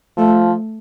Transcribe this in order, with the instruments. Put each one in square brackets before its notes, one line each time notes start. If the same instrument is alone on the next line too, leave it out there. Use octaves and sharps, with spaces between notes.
[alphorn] F3 [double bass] A3